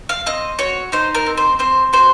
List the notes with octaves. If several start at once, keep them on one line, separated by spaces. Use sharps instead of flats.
F5
C4 D#5
F#4 C#5
D#4 C5
A#4
C4
C5
C4 C5
F#4 C5